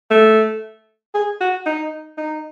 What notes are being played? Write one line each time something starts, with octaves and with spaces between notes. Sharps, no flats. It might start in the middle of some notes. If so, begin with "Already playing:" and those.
A3
G#4
F#4
D#4
D#4